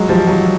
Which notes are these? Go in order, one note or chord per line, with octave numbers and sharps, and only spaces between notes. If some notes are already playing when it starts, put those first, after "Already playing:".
Already playing: F#3 G#3
F3 G3
F#3